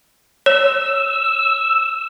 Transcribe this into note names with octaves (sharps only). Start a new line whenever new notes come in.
C#5 E6